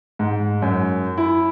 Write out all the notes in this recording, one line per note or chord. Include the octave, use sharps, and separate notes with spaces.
G#2
F#2
E4